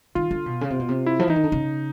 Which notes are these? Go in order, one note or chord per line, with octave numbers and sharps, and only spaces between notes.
D#3 F4
D3
B2
C#3
C3
B2
C3
E4
F3
E3 D#4
D#3
D3
C#3